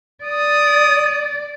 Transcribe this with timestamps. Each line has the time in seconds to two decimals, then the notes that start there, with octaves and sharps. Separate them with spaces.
0.24 D5 D#6